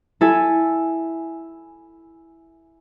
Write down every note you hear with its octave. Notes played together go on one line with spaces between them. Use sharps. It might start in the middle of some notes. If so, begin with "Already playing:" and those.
E4 A4 G#5